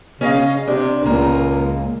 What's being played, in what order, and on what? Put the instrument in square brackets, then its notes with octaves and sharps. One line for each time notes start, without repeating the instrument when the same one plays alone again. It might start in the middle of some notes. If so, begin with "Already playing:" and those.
[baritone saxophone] C#3 [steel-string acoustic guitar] C#4 D#5 F5
[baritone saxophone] C3 [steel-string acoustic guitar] D4
[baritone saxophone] C#2 [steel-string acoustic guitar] A#2 A#3